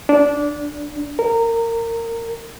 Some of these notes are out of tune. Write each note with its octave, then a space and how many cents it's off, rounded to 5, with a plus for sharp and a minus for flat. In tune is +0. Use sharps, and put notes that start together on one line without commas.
D4 -15
A#4 -20